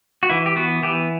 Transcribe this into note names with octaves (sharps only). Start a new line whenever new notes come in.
F#4
E3 E4
G4
B3 F#4
E3 G4